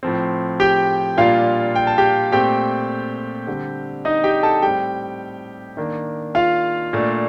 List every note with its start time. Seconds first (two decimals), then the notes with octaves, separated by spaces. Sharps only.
0.03 A2 F3 C4
0.60 G4 G5
1.17 A#2 G3 A#3 D4 F4 F5
1.76 G5
1.87 A5
1.98 G4 G5
2.32 A#2 A3 C4 G4 G5
3.47 D3 G3 C4
4.05 D#4 D#5
4.24 G4 G5
4.43 A4 A5
4.62 A2 G3 C4 G4 G5
5.77 D#3 A#3 D4
6.35 F4 F5
6.93 A#2 A3 D4